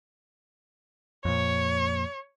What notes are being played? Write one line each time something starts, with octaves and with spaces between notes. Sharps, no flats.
F2 A#2 C#5